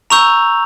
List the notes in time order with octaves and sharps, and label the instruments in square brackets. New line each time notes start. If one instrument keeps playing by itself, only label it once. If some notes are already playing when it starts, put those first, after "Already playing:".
[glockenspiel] A#5 C#6 E6 G6 F7